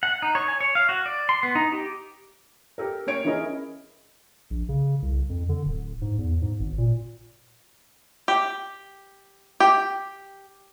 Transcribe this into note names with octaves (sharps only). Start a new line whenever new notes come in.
F#5
D#4
C#5
G#5
C#5
F5
F#4
D5
C6
B3
D#4
G4
G4 A4 A#4
A#3 C#4 C#5 D7
E3 C#4 E4 G#4 A#4 D#5
A#1
C#3
C2
F2
D3
D1
G#2
E2
G#2
G#1
A#2
G4
G4